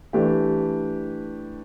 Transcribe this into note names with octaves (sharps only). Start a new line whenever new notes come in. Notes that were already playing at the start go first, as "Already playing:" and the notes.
E3 A3 D4 G4